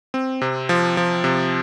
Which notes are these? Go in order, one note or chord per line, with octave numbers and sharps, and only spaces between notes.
C4
C3
F3
F3
C3